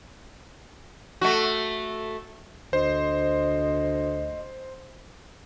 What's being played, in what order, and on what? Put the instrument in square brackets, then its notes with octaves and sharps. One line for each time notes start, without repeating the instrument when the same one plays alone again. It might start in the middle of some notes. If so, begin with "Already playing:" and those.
[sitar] A3 F#4
[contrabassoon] D2 [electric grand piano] C5 [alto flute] D#5